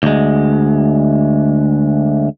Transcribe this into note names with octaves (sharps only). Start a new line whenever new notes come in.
D2 G#3